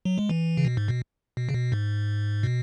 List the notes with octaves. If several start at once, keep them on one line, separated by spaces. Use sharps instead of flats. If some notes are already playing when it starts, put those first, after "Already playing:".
F#3
G#3
E3
C#3
B2
G#2
B2
B2
C#3
B2
G#2
B2